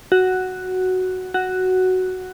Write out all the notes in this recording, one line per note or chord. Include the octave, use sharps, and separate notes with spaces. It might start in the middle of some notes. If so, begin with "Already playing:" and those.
F#4
F#4